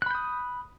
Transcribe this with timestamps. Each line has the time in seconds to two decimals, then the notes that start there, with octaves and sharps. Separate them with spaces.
0.02 F#6
0.06 B5
0.11 G6
0.15 D#6